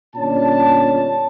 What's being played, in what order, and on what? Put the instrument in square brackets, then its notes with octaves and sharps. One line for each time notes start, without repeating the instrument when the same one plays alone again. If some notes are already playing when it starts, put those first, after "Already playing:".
[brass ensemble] G1 A#2 C#4 D4 A5